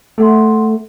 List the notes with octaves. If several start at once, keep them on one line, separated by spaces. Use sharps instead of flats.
A3 A4 F#5 C6